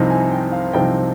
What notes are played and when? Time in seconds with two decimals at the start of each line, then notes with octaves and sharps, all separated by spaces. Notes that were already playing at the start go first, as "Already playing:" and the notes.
Already playing: C2 C3 F3 C4 D#4
0.10 G#5
0.32 G5
0.52 F5
0.73 C2 C3 F3 C4 D#4 G5